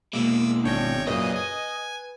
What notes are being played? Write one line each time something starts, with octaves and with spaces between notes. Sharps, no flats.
B2 G#3 A#3 D6 E6
G#1 D4 C#5 G5 A#6
F#2 A#2 C#3 B4 D#5
G#5